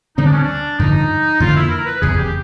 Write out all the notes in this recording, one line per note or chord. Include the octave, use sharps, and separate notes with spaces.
D2 D3 G3 C4 D#4
D4
C#4
D4
G2 D3 F3 D#4
F2 D3 F3 A#3 F4
E4
A#4
B4
F1 E2 C#3 G#4
G4